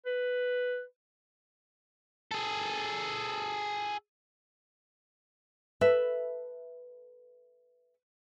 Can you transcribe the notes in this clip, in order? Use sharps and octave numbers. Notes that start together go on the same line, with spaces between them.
B4
G#4 A4
A4 B4 E5